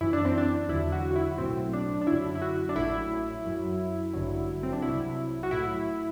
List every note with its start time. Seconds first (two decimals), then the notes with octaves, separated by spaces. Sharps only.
0.01 F#2 E3 E4
0.13 D4
0.25 C4
0.38 D4
0.69 E2 D3 F#3 E4
0.92 F#4
1.11 F#4
1.16 E4
1.38 B1 A2 F#3 C4
1.73 D4
2.01 D4
2.07 F#2 D3 F#3 E4
2.35 E4
2.42 F#4
2.69 D4
2.76 A1 A2 F#3 E4
3.45 F#2 F#3
4.13 A1 G2 D3 F#3
4.63 C4
4.73 D4
4.82 C2 C3 F#3 E4
5.43 F#4
5.51 A2 F#3 E4